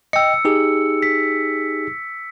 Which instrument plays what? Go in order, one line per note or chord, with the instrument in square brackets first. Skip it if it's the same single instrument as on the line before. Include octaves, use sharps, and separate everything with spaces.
[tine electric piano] D#5 G5 [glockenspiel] E6 C#7
[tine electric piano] D#4 G4 G#4
[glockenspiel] B6